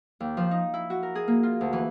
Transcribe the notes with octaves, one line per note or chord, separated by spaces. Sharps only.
D#2
F3
D#4
E4
F#4
A#4
G#4
A#3
F4
D2
E3